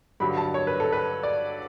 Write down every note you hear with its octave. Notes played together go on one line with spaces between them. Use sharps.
G2 D3 F#3 B5
A5
C#5
B4
A4
B4
D5